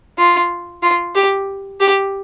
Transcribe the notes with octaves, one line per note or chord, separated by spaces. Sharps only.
F4
F4
G4
G4